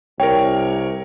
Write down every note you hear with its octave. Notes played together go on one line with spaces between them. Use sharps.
C2 A#4 C#5 G5